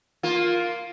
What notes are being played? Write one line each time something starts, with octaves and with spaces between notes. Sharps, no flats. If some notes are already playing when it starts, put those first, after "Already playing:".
A#3 F4